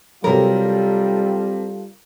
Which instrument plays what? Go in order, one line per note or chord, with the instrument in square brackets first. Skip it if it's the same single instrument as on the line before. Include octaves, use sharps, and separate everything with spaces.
[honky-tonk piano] C3 F#3 [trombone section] G3 F4 A4 [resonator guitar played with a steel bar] A#4